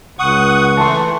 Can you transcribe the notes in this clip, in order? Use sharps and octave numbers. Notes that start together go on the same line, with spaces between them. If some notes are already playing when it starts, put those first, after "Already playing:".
C#2 F#5 C#6 D#6
E3 A3 A5 C6